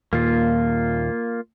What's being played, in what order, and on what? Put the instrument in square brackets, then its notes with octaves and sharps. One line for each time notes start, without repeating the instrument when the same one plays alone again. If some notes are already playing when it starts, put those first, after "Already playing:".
[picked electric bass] D#2 A#2 [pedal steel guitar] A#3 F4